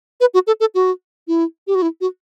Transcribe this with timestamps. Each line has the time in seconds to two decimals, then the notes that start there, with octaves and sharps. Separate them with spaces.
0.21 B4
0.34 F#4
0.47 A4
0.60 A4
0.75 F#4
1.28 E4
1.67 G4
1.75 F#4
1.82 E4
2.01 F#4